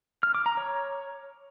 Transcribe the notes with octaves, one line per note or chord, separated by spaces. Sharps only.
F6
D6
A#5
C#5